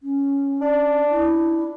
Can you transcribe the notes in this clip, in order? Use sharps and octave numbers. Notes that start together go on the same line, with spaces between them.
C#4
D4
E4